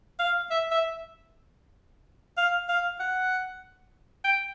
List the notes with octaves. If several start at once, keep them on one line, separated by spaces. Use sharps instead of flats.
F5
E5
E5
F5
F5
F#5
G5